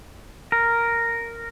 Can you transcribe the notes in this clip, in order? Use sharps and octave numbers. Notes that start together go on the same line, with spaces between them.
A#4